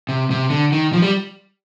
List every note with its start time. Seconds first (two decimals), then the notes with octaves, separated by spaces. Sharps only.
0.09 C3
0.31 C3
0.50 D3
0.72 D#3
0.93 F3
1.02 G3